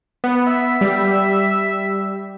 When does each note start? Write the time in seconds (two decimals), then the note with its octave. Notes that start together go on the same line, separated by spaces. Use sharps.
0.24 B3
0.47 E5
0.81 G3